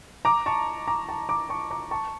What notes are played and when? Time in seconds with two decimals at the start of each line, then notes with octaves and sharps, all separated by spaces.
0.25 A#5 D6
0.46 A5 C#6
0.88 A#5 D6
1.09 A5 C#6
1.29 A#5 D6
1.49 A5 C#6
1.71 A#5 D6
1.91 A5 C#6